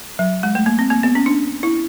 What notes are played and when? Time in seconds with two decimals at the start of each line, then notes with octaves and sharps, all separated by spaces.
0.19 F#3
0.43 G#3
0.55 A3
0.66 A#3
0.79 C4
0.90 A#3
1.03 B3
1.15 C#4
1.26 D4
1.63 E4